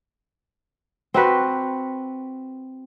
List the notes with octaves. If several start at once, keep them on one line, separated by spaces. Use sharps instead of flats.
C4 F#4 B4